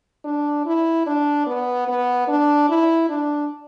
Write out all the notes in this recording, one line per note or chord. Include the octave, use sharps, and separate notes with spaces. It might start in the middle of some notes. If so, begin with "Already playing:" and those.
D4
E4
D4
B3
B3
D4
E4
D4